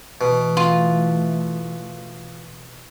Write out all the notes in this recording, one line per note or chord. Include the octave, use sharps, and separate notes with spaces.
B2 E3 A3
F4